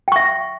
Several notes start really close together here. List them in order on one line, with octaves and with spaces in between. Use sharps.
G5 C#6 E5